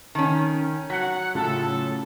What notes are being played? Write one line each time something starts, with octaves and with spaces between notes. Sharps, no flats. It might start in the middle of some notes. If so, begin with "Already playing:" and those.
D#3 C#4 A5 D#7
F#3 F#5 B6
A2 C#3 F4 A4